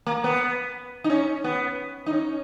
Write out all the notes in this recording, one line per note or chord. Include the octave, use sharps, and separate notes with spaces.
A#3
B3
D#4
C#4
B3
D#4
C#4